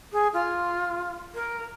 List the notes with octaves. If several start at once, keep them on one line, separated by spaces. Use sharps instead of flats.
G#4
F4
A#4